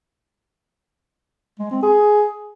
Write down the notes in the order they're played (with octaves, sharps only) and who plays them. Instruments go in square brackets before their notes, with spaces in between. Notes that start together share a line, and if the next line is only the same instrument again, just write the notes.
[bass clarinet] G#3
C4
G#4